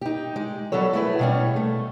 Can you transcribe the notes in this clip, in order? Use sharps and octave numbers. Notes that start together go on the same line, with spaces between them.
D#4 G4
G#3
F#3 G3 B3 A4 C#5
A3 E4 G#4 B4
B2 G3 C#4
A3